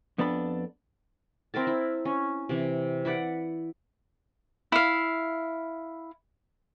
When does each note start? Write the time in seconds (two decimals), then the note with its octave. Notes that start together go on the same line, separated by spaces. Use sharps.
0.18 F2 B3 D4 A4 B5
1.54 C4 E4 A#4 A5
1.67 E4
2.05 C#4
2.49 C3 E3
3.05 E4 B4 D5 F#5
4.72 E4 F5